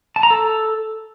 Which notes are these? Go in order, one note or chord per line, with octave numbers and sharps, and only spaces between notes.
A5
A#5
A4